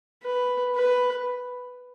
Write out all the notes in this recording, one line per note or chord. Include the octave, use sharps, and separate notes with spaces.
B4
B4